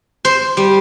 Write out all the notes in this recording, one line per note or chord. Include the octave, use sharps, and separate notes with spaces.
C5
G3